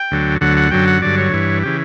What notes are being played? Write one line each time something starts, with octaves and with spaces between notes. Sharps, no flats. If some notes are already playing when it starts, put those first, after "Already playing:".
Already playing: G5
D2 D3 F#3
D2 D3 F#3 F#5
F#5
F#2 D3 F#3 G5
F#5
G2 D3 F#3 D5
C#5
G2 E3
C#3 E3 G4